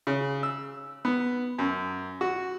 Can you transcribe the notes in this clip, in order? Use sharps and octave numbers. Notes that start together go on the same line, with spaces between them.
C#3
E6
B3
F#2
F#4